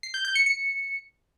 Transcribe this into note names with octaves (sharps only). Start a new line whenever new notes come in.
C7
G6
G6
C#7
C#7